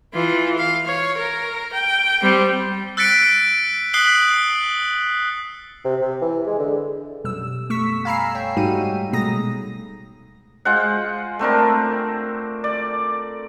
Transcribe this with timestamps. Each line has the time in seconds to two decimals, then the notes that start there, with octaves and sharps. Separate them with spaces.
0.13 E3 F4
0.58 F5
0.86 C#5
1.17 A#4
1.73 G5
2.22 G3 C4
2.97 E6 F#6 A6 B6 C#7 D7
3.94 D#6 F#6 B6 C7 F#7 G7
5.84 C3
6.01 C3
6.22 E3
6.46 G#3
6.59 D3
7.24 F#2 B2 G3 E6
7.70 A3 C#6 E6 B6
8.05 F5 G#5 A#5 B5 E6 C7
8.35 C#5 G5
8.57 G#2 G3 A3 D#4 F#4 D#7
9.13 B2 G#3 A3 A#5 D#6 A#6
10.65 G#3 F4 C5 F#5
11.39 A3 C4 D4 A#4
12.64 D5